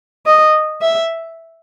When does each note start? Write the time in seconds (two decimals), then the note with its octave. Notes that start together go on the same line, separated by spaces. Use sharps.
0.26 D#5
0.82 E5